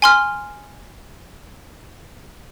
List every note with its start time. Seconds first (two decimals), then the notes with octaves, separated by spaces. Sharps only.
0.02 G#5 C6 F6